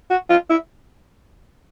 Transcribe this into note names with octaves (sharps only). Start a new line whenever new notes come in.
F#4
F4
E4